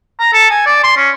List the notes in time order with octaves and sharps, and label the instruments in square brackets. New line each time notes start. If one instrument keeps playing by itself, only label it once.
[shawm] A#5
A4
G#5
D5
C6
C#4